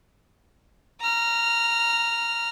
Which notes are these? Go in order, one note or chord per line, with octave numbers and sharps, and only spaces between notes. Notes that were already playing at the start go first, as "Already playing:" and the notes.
A#5 F6